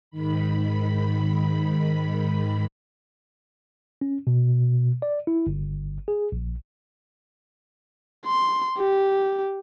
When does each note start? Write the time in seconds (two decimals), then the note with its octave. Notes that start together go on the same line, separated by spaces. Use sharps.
0.11 G#2 D#3 B5
4.01 C#4
4.27 B2
5.02 D5
5.27 E4
5.47 G1
6.08 G#4
6.32 A#1
8.26 C6
8.78 G4